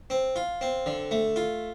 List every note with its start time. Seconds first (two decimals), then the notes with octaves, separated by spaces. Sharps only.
0.10 C4
0.36 F4
0.61 C4
0.86 D3
1.11 A3
1.36 F4